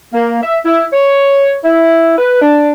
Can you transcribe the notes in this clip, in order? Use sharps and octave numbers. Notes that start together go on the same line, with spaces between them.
A#3
E5
E4
C#5
E4
B4
D4